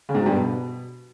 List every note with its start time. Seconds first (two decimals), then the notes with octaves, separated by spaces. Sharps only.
0.09 C#3
0.15 G#2
0.20 F#3
0.26 G2
0.32 B2